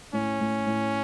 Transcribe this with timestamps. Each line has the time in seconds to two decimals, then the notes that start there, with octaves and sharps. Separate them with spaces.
0.13 A2 C#4
0.40 A2
0.67 A2